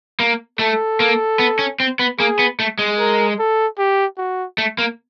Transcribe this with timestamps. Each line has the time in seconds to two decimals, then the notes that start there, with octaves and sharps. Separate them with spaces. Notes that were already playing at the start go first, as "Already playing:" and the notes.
0.20 A#3
0.59 A3 A4
1.00 A#3
1.39 B3
1.59 C#4
1.80 C4
1.99 B3
2.19 A#3 G#4
2.39 B3
2.60 A3
2.79 G#3
2.99 A#4
3.39 A4
3.78 G4
4.18 F#4
4.58 A3
4.78 A#3